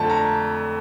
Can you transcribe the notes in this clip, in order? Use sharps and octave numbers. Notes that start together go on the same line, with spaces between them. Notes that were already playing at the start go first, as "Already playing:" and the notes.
Already playing: F2 D3 A3 A5
A#5